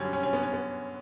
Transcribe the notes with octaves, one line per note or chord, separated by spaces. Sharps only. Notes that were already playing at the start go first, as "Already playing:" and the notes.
Already playing: F#2 D3 G3 C#4
C#4
C#4
B3
C#4
B3